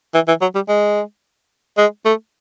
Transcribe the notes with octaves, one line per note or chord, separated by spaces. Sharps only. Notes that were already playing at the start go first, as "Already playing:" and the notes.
E3
E3
F#3
G3
G#3
G#3
A3